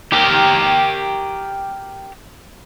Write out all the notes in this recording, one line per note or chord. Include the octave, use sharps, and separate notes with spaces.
G4 A#4